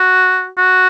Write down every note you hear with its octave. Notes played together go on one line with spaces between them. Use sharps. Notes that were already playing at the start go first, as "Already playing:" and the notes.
Already playing: F#4
F#4